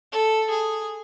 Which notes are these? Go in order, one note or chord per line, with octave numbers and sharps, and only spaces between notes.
A4
G#4